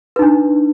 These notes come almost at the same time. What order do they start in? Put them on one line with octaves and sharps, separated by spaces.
B4 D#4 D4